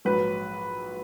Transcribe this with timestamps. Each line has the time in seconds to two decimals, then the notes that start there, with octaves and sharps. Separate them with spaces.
0.05 A#1 G#2 F#3 B4